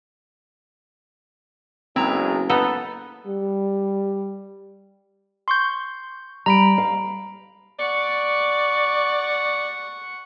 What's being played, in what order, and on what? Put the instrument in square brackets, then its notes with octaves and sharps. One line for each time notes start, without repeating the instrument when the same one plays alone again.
[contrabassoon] F#1 [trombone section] B1 F#3 G#3 [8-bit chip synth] C4 A#5 [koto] E4
[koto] B3 D#4 A4 [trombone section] B4
[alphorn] G3
[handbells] C6 C#6 G6
[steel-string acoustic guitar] G3 [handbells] A#5 B5 D7
[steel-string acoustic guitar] F5
[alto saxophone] D5 [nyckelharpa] F#5 C#6